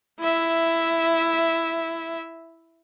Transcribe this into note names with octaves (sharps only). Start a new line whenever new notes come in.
E4 E5